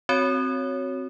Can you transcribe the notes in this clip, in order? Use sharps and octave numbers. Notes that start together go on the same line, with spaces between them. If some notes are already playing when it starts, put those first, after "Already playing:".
C4 F#4 C#5